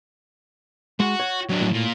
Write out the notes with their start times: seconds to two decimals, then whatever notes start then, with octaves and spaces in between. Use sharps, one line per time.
1.00 G#3 F#4
1.20 C#5
1.49 F#3 D4
1.61 A2
1.73 A#2